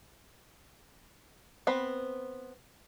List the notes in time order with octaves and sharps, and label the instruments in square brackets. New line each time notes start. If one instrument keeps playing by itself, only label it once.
[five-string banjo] B3 C4 F#5 B5